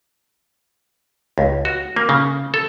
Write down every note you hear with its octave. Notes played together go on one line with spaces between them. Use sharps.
C#2
F#4
A#3
C#3
A4